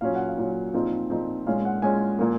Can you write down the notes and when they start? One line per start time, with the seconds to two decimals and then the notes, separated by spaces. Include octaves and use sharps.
0.01 A#2 F#3 C#4 F5
0.15 F#5
0.28 F5
0.38 A#2 F#3 C#4
0.73 A#2 F3 C4 D#4
1.10 A#2 F3 C4 D#4
1.47 A#2 G#3 C#4 F5
1.65 F#5
1.82 A#2 G#3 C#4 G#5
2.19 A#2 F3 A#3